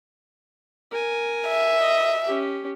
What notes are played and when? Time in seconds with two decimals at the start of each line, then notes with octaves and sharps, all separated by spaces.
0.91 A#4 G#5
1.48 E5
1.81 D#5
2.26 C#4 G4